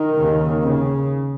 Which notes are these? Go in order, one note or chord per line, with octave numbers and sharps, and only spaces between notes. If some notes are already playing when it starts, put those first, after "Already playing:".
Already playing: D#3
D#2 C#3
C#3